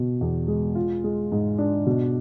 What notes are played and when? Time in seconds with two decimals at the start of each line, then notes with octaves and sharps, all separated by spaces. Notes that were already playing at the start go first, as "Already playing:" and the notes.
Already playing: B2 B3
0.21 E2
0.48 G#3
0.75 F4
1.04 G#3
1.32 G#2
1.58 D4
1.86 B2